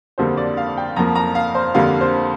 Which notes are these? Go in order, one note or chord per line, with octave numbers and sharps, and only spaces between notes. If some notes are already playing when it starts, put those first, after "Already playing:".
F2 D3 G3 A#3 C5
D5
F5
G5
F2 F3 A#3 A#5
A#5
F5
C5
F2 D3 G3 A#3 F5
C5